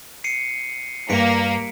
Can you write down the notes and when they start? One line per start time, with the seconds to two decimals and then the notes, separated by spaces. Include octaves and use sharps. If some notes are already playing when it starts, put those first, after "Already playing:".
0.24 C7 C#7 D#7
1.09 G2 A#3 B6 C#7 D7